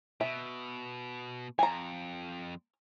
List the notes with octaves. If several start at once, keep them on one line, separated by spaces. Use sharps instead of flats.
B2 E5
F2 G#5 A#5